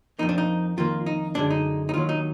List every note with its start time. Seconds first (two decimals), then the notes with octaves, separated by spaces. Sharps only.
0.19 F2 F3 A#3 D#4
0.29 D4
0.38 D#4
0.77 F2 D#3 A#3 F4
1.06 D#4
1.35 F#2 D3 G#3 D4
1.50 D#4
1.89 D#4
1.94 D#2 D#3 F#3 F4
2.09 D#4